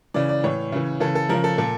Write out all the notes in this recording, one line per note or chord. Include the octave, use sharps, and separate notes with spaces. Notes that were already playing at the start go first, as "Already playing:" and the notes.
C#3 E3 D5
D5
A2 E3 C#5
C#3 E3
C#3 E3 A4
A4
C#3 F3 A#4
A4
A#2 A4